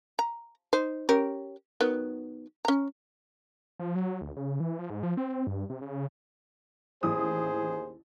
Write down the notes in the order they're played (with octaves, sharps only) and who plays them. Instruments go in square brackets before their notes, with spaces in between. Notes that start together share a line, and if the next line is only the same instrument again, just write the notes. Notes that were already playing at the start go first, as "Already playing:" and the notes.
[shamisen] A#5
D#4 C5
C#4 G4 A#4
D#3 F#3 B3
C#4 A#5
[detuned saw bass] F3
F#3
D2
C#3
E3
F3
G#2
F3
C4
G2
C3
C#3
[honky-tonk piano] A1 E4 D#6 [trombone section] D#2 G#4 C5